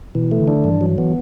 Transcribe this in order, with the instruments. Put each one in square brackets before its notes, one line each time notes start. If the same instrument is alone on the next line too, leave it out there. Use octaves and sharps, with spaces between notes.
[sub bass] B2 [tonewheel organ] E3
[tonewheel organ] A3
[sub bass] D3
[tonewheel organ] D4
[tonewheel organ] G2 [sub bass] E3
[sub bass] E3 [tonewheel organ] F#3
[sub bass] E3 [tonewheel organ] B3